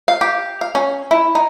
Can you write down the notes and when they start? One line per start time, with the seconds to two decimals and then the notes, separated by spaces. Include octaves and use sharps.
0.08 F5
0.21 G4
0.61 F5
0.75 C#4
1.11 E4
1.35 D#4